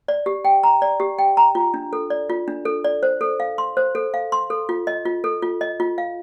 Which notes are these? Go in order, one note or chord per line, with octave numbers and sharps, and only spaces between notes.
D5
G4
G5
A#5
D5
G4
G5
A#5
F4
D4
A4
D5
F4
D4
A4
D5
C5
A4
F5
C6
C5
A4
F5
C6
A4
F4
D#5
F4
A4
F4
D#5
F4
F5